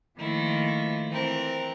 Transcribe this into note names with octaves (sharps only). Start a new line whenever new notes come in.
D#3 F3 A3 A#3 E4 F4
E3 C4 A#4